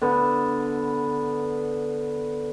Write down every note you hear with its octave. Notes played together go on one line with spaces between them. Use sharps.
D3 B3